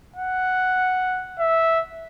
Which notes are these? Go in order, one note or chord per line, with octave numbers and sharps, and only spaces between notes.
F#5
E5